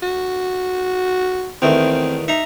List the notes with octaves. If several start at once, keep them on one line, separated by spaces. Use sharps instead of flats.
F#4
E2 D#3 A3 C4
D#4 E5 A#5